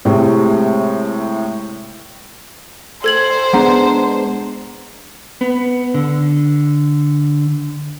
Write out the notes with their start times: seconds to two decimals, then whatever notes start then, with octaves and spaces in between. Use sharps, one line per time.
0.05 A2 C3 G#3
3.04 A4 C5 G#6 F#7
3.53 G#3 B3 D4 G#4 F#5 A#5
5.41 B3
5.94 D3